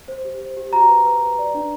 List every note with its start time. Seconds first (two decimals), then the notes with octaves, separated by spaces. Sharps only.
0.08 C5
0.25 G4
0.41 C5
0.57 G4
0.73 F#4 A#5
0.89 B4
1.06 B4
1.22 B4
1.39 D5
1.54 D4